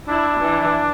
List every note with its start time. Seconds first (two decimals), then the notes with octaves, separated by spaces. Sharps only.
0.08 D4 E4
0.42 E3